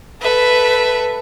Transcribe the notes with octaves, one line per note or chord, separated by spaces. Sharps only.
A4 B4 E5